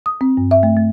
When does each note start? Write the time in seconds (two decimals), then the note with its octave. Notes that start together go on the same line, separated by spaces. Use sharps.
0.06 D#6
0.21 C4
0.37 G2
0.51 E5
0.63 A3
0.77 A3